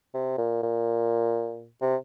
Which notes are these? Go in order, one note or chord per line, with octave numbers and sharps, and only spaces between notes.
C3
A#2
A#2
C3